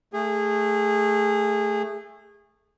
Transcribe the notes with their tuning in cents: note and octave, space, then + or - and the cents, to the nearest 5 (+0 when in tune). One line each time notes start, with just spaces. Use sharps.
A3 +0 G#4 -25